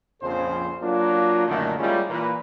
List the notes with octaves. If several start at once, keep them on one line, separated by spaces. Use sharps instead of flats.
A#1 F2 C#3 A4 C5
F#3 A#3 D4 F4
F#2 A#2 D3 D#3 A3
G3 G#3 A#3 C#4 E4 F4
A#2 E3 B4